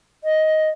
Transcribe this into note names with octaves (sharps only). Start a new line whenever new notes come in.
D#5